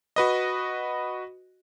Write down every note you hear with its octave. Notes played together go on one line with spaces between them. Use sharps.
F#4 B4 D#5